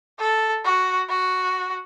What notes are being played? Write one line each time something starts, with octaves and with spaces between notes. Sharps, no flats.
A4
F#4
F#4